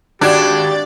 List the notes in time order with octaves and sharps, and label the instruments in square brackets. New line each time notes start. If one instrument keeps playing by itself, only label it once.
[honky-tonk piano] G#1 F#4 G#6 [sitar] D4 [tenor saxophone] G4 [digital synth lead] D5